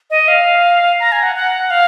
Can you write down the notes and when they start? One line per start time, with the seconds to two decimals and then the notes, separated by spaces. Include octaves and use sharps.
0.10 D#5
0.28 F5
1.00 A#5
1.12 G#5
1.23 F#5
1.35 F#5
1.71 F5